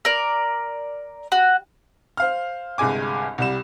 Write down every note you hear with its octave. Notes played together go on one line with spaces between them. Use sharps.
A#4 D5
F#4
C5 F5 F6
G1 C2 G2 G#3 G#5 D6
C2 G3 E7